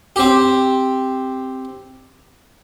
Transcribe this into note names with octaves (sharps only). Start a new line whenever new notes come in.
C4 G4